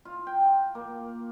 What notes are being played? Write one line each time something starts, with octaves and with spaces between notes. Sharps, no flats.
F4
G5
A#3